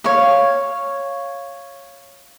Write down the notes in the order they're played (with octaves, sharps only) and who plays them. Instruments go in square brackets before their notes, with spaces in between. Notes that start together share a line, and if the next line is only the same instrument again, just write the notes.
[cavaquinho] C#5 F5